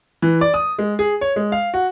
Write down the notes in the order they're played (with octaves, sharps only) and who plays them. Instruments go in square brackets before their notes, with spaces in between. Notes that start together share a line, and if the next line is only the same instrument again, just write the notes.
[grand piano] E3
D5
D#6
G#3
G#4
C#5
G#3
F5
F#4